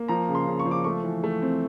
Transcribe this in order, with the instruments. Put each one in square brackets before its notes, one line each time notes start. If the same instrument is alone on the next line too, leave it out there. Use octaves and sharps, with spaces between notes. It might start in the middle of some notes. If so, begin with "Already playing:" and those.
Already playing: [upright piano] A#3
F3 A#5
C#3
C6
C#3
C#6
F3
D6
A3 C#6
E3
A3
C4